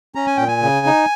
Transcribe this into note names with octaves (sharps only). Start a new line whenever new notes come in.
C#4 A#5
G#5
A#2 G5
G#5
C#3
D#4